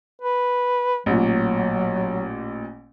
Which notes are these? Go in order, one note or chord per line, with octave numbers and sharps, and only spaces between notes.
B4
A1 A#2 F#3